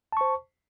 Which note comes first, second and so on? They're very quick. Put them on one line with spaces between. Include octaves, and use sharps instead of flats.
A5 C#6 C5